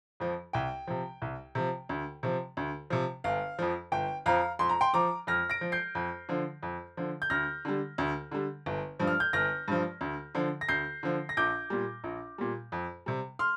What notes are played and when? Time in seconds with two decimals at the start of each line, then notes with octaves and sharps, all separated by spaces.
0.20 F2 F3
0.53 C2 G5
0.87 C3 F3
1.22 C2
1.55 C3 F3
1.89 D2
2.23 C3 F3
2.57 D2
2.90 C3 F3
3.24 G1 F5
3.59 F2 F3
3.92 G1 G5
4.26 F2 F3 F5 A#5
4.59 F2 C6
4.69 A#5
4.81 G5 C6
4.94 F3 A#5 D6
5.27 F2 F6 A#6
5.50 A#6 D7
5.61 F3
5.72 G6 C7
5.95 F2
6.29 D3 F3
6.63 F2
6.97 D3 F3
7.22 G6
7.30 D2 F6 A#6
7.65 D3 G3
7.98 D2
8.31 D3 G3
8.66 G1
8.99 G2 F3
9.07 F6
9.20 G6
9.33 G1 F6 A#6
9.68 G2 F3
10.01 D2
10.35 D3 F3
10.61 A#6
10.69 D2 G6 C7
11.03 D3 F3
11.29 A#6
11.37 A#1 D6 G6
11.70 A#2 G3
12.04 A#1
12.38 A#2 G3
12.72 F2
13.06 C3 G3
13.39 C6 F6